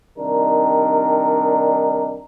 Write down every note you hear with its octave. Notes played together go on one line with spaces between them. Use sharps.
C3 D#3 G3 D4 D#4 A#4